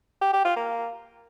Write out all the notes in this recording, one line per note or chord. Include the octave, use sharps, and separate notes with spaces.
G4
G4
F4
A#3